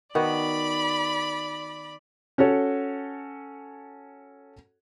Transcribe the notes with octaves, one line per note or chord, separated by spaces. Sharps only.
D#3 B3 F#4 D5 B5
C#4 F#4 A4 C#5